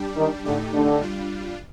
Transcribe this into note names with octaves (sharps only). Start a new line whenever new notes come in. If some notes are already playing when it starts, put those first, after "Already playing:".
Already playing: G3 D4 G4
D#3
A2 D3 A3 D#4 G4
D3
G3 D4 F4